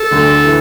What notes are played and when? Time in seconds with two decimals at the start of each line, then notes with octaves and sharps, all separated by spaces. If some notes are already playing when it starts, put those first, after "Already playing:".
Already playing: A4
0.11 D2 D3
0.45 E3